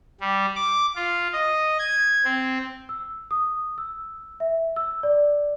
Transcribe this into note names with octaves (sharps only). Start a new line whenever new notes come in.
G3
D6
F4
D#5
G#6
C4
E6
D#6
E6
E5
E6
D5